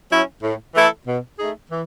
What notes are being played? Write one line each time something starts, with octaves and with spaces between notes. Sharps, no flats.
F#3 C#4 E4
A2
E3 A3 E4 A4
B2
A3 D#4 G#4
E3